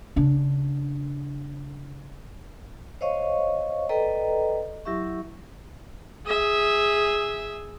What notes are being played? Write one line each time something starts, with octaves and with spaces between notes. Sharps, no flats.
C#3 D4
C5 C#5 D#5 F5 C#6
A4 B4 D5 D#5 G5 A#5
F#3 E4 G4 E5 C#6
G#4 E5